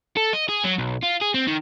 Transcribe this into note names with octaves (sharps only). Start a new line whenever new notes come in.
A4
D#5
G#4
F#3
B1
F4
G#4
C4
D#3